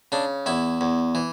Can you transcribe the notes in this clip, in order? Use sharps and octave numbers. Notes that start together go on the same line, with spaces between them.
C#3 D4
E2 E4
E2
E3